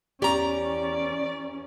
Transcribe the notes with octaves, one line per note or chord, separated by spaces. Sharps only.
E2 C#4 G4 D5 A#5